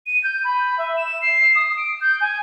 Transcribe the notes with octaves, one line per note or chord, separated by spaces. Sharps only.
D#7
G6
B5
E5
E7
C7
D#6
D7
G6
G#5